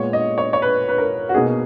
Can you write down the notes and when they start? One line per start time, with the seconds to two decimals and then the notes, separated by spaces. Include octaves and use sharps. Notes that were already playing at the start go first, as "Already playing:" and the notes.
Already playing: A#2 G#3 B3 C#5
0.13 D#5
0.38 C#5
0.53 C#5
0.62 B4
0.89 B4
0.98 A#4
1.29 F#4
1.34 B2 A#3 D#4 G#4